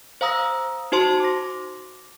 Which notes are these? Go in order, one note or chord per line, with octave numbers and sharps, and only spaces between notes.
C5 F5 A#5 D#6 E6 A#6
D#4 F#4 C5 A5 C6
D6 A#6